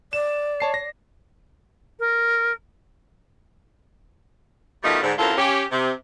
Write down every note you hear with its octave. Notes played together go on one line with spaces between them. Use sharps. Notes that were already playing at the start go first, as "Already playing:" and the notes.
D5 E7
C#5 A5 C7
A#6
A#4
B2 D#3 G3 A3 F4 D#5
G#2 D3
F#2 A2 C3 F4 A4 A#4
C#4 G4
C3